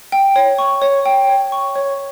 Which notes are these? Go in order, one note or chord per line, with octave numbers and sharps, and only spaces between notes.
G5
C#5
C#6
C#5
G5
C#5
C#6
C#5